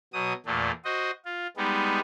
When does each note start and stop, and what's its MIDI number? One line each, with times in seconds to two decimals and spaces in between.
0.13 0.33 47
0.13 0.33 54
0.13 0.33 87
0.46 0.71 40
0.46 0.71 46
0.46 0.71 57
0.85 1.11 66
0.85 1.11 72
0.85 1.11 75
1.25 1.47 65
1.57 2.00 55
1.57 2.00 56
1.57 2.00 59
1.57 2.00 63